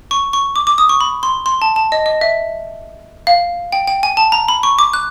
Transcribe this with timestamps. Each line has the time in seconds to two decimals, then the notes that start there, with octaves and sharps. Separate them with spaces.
0.11 C#6
0.33 C#6
0.56 D6
0.67 D6
0.78 D#6
0.89 C#6
1.01 B5
1.23 C6
1.46 C6
1.62 A5
1.76 A5
1.92 D#5
2.06 D#5
2.21 E5
3.27 F5
3.72 G5
3.87 G5
4.03 G#5
4.17 A5
4.32 A#5
4.48 B5
4.63 C#6
4.79 D6
4.93 F#6